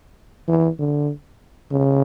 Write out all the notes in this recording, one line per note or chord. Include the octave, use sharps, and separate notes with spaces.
E3
D3
C#3